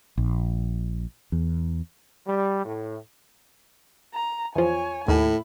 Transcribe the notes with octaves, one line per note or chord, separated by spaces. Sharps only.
A#1
E2
G3
A2
A#5
E2 F3 C#5 G#5
D#2 A2 E4